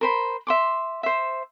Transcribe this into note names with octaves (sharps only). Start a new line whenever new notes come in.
A#4 C5 B5
E5 C6 D6
C5 E5